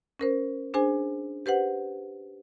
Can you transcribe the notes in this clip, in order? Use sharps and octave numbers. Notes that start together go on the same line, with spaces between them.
C#4 A#4 C5
D4 G#4 C5 G#5
G4 B4 C5 F#5